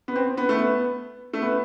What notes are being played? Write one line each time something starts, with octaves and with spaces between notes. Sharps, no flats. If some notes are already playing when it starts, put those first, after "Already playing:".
B3
C4
B3
A3
B3
A3
B3